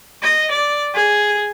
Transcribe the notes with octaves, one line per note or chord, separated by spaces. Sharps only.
D#5
D5
G#4